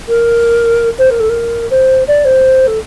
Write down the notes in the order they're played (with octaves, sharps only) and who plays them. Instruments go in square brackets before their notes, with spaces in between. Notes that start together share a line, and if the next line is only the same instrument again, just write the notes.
[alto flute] A#4
C5
A#4
A4
A#4
C5
D5
C5
A4